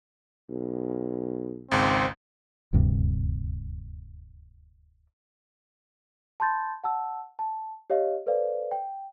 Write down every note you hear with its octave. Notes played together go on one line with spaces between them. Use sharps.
B1
G#1 C#2 G#2 C4
D#1 D2 G2 C3
A5 B5 C6 G6 A6
F#5 A5 E6
A5
G4 C#5 D#5 F5
A4 B4 C5 D5 F5
G5